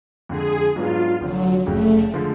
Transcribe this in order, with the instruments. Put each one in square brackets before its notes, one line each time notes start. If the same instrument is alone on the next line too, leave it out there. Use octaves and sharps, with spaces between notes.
[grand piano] F2 D3 G#3 [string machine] G#4
[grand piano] G#2 F#3 B3 D4 [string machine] F4
[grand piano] F1 F2 D3 F3 [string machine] F#3
[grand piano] F1 F2 C#3 [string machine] A3
[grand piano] D3 F3 G#3